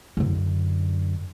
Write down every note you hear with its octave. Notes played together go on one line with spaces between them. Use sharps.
F#2 D3